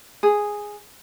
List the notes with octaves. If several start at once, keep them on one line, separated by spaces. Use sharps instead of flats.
G#4